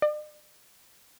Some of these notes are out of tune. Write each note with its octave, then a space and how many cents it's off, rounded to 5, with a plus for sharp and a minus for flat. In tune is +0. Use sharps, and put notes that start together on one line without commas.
D5 +45